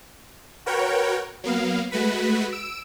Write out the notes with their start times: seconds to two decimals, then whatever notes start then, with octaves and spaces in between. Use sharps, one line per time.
0.66 F#4 A#4 B4 C#5 F#5 G5
1.44 F#3 A#3 B3 F5
1.91 G#3 A3 F#4 B4 B6
2.52 E6 D7 E7